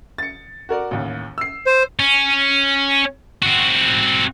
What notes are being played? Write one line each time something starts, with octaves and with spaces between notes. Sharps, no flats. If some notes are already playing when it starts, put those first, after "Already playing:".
A6 C#7
F#4 A#4 D5
A1 D#2
E6 C7
C5
C#4
C4 F#4